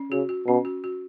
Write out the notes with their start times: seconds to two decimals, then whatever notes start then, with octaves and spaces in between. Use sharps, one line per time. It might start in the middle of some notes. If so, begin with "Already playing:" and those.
Already playing: C#4
0.11 C#3 F#4
0.29 F#4
0.47 B2 C#4
0.65 F#4
0.84 F#4